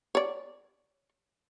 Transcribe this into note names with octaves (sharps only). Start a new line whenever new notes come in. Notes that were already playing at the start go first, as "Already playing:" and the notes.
C#5 D5